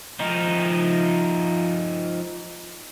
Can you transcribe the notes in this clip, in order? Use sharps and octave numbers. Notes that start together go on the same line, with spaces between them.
F3 D#4